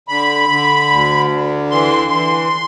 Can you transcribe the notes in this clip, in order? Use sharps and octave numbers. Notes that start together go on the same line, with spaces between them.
D3 B5
D3
D2
D3
E3 C6
E3